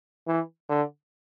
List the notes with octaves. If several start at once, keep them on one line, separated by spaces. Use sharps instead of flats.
E3
D3